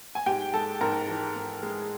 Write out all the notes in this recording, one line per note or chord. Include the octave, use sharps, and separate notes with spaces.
G#5
G#2 G4 G5
G#3 A4 A5
G#2 A#4 A#5
E3
G#2
G#3